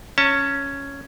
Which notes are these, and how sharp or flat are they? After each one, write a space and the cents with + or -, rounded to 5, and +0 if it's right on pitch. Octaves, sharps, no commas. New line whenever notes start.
C#4 +0 A5 +35